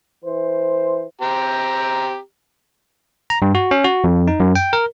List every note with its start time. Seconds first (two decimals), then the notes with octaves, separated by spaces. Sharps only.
0.25 E3 C5
1.21 C4 G4 A#5
3.30 A#5
3.42 G2
3.55 F#4
3.71 C#4
3.84 F#4
4.04 F2
4.28 D#4
4.40 F#2
4.55 G5
4.73 A#4